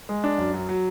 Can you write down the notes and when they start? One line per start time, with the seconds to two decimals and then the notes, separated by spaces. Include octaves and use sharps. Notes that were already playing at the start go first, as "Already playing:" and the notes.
0.09 G#3
0.24 D4
0.38 F#2
0.54 F#3
0.69 F#3